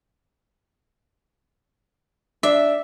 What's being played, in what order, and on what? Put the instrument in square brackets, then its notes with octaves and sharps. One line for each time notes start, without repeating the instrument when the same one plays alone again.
[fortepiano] D4 [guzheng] E5